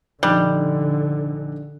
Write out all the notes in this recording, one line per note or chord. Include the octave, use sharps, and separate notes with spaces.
A#1 D3 G3 D#4 F#6